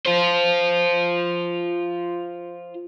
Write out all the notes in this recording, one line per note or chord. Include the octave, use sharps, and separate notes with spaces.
F4 C5